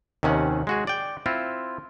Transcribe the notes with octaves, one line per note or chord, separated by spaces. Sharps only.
D#2 C3 D#3 C#4 F#5
G#3 F#4 G#4
D5 G5
C4 E4 F4